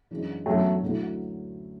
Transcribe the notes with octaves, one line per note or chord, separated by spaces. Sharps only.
F#2 E3 G#3 D4
F#2 E3 F#3 A3 B3 D4
D2 D3 F#3 A3 E4